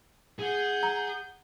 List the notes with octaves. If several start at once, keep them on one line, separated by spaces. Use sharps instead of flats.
G#4 F#5 G6
A#5